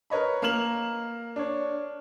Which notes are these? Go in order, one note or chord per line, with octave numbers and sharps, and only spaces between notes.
A#4 B4 C#5 D#5 B5
A#3 A#5 F6 E7 F#7
D4 C#5